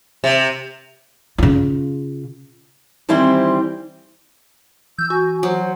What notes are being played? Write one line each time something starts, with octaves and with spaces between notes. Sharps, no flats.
C3
C#3 F4
D#3 E3 G3 C4 E4 C5
E3 E6 G6
F#4 G#5
F#3 C5